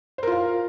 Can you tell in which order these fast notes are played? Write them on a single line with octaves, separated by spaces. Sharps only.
C5 A#4 F4 F5